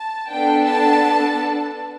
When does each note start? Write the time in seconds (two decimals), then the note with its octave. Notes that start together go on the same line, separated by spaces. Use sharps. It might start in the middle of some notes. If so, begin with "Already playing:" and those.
Already playing: A5
0.30 B3 D4 A4 G5
0.66 A5